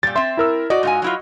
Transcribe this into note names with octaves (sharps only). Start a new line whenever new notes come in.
A#2 G3 A6
C4 E5 C6
E4 A#4 E6
F#4 D5 D#5
G#2 F4 G#5
F#3 E4 F4